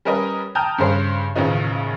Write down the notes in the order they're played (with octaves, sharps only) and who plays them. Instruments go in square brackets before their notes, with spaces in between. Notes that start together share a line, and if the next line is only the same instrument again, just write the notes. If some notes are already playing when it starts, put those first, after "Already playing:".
[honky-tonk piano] G3 C#4 A#4 B4 D#5
G5 A5 A#5 D#6 F6 G6
G2 C#3 C5 C7
A1 D#2 C#3 F3 D#4